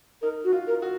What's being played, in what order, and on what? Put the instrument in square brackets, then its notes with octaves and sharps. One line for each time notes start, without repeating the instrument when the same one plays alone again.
[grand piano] D#4 [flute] A#4
[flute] F#4
[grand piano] F4
[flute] A#4
[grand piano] F#4